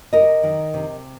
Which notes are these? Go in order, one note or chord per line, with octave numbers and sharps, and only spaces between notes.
C3 A#4 D#5
D#3
C3